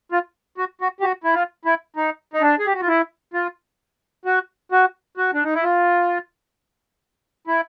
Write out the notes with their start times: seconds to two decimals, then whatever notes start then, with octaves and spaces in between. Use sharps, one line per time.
0.12 F4
0.58 F#4
0.81 F#4
1.00 G4
1.03 F#4
1.24 E4
1.34 F4
1.65 E4
1.96 D#4
2.34 D#4
2.42 D4
2.59 G#4
2.66 G4
2.74 F#4
2.81 F4
2.88 E4
3.34 F4
4.25 F#4
4.72 F#4
5.17 F#4
5.34 D4
5.44 D#4
5.54 E4
5.63 F4
7.47 E4